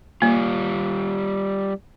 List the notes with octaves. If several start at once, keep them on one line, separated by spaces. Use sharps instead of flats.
G3 A#3 F4